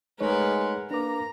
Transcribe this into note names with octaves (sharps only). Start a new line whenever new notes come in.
G#3 A3 D#4 A#4 B4 C#5 F#5
A#3 D4 B4 A#5 D6